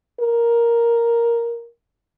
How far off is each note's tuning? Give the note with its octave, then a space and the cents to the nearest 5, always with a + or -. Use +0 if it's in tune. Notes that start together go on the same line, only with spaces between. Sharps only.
A#4 +5